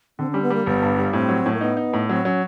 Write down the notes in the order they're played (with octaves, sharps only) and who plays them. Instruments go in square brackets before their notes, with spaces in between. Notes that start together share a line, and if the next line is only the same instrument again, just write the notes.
[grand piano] D3 [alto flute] C4
[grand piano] G3 [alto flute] C#4
[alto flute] B3
[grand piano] G3 [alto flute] A#3
[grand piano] G1 [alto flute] B3
[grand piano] G2
G3
[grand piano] A2 [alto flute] C4
[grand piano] F#3
A2
[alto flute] A#3
[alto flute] B3 [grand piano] D#4
[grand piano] D#4
A2
[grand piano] F#3 [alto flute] C4
[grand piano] F#3 [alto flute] C#4